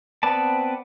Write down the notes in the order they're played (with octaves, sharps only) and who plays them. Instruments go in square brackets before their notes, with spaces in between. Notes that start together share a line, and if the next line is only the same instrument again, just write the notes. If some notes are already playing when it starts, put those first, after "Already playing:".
[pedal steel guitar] B3 C4 B4 D5 A5